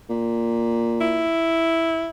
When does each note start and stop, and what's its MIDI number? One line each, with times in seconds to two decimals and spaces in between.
0.09 1.30 46
1.01 2.10 64